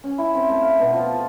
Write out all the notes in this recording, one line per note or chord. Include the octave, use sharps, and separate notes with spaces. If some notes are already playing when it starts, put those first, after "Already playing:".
C#4
E4
C4
A3
F5
B2
F3
A4